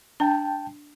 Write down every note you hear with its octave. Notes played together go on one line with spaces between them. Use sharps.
D4 G5 A5